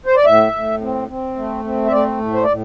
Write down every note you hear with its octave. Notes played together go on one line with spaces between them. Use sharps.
C5
D5
A2 E5
A2
C4
C4
A3
C4
E5
A3 D5
A2
C5
A2 D5